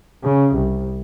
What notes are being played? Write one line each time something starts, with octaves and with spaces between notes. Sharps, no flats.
C#3
C2